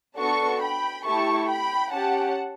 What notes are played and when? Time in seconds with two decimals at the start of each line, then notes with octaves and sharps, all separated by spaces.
0.19 B3 D4 F#4 A4 A5 C#6
0.62 G5 B5
1.06 A3 E4 G4 A5 C#6
1.49 G5 B5
1.92 C#4 G4 F#5 A5